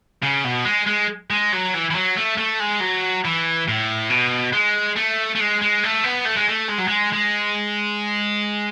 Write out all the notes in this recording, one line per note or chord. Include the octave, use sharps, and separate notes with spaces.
C#3
B2
G#3
G#3
G#3
F#3
E3
E3
F#3
A3
A3
G#3
F#3
E3
A2
B2
G#3
A3
A3
G#3
G#3
A3
B3
A3
G#3
A3
G#3
F#3
G#3
G#3